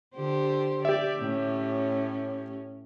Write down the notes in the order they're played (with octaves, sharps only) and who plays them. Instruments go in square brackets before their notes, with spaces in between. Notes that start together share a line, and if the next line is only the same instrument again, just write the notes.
[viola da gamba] D3 G4 C5
[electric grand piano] G4 E5 [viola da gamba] D5
[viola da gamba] A2 C#4